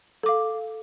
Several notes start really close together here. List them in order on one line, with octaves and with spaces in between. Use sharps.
A4 D6 F5